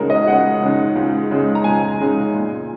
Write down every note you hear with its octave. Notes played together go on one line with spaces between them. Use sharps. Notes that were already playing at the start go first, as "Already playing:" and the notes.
Already playing: C#2 C#3 G#3 D#4 F#4 G#4 A#4
D#5
C#2 F#5
C#3 G#3 D#4
C#2
C#3 G#3 D#4
A#5
C#2 G#5
C#3 G#3 D#4
A#2